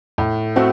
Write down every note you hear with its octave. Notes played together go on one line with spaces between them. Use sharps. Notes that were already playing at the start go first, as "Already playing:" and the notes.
A2
A3 C4 F#4 A4